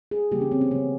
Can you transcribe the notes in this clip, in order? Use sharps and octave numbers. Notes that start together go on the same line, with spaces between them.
G#4
C#3 E3 G3 A#3 G4
C#4
C4
C#4
C#3 F3 G#3 B3